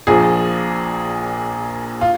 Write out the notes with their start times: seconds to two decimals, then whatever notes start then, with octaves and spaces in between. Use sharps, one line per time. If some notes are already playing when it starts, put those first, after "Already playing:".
0.07 A#1 A#2 F3 G#4
2.01 F4